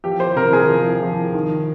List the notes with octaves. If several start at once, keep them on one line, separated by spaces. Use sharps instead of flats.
F3 G4
C5
C3 A#4
G#4
F3
F3
D#3